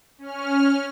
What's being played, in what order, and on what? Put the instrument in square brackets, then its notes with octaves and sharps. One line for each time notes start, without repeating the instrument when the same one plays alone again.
[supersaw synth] C#4 F6